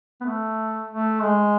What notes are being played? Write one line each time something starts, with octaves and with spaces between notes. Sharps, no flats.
B3
A3
A3
G#3